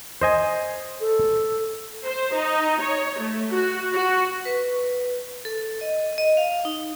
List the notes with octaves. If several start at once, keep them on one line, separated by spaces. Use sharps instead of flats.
C5 D#5 G#5
A4
C5
D#4
C#5
A3
F#4
F#4
B4
A4
D#5
D#5
F5
D#4